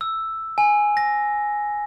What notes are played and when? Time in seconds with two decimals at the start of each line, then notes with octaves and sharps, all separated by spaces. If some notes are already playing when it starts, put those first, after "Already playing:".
0.01 E6
0.58 G#5
0.97 A#6